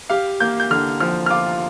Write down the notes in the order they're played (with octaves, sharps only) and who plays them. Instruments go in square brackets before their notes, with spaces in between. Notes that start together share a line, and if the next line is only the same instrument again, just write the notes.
[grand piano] G4 [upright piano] F5
[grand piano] A#3 [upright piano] G6
[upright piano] G6
[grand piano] D3 [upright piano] F6
[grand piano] F3 [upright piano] F6
[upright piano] F6
[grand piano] F4 [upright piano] D6